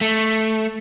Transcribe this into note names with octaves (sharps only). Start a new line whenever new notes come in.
A3